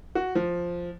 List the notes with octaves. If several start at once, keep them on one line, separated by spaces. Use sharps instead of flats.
F#4
F3